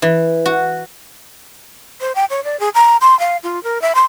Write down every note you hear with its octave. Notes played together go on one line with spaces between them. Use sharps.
E3
F#4
C5
G5
C#5
D5
G#4
A#5
C6
F5
F4
A#4
E5
C6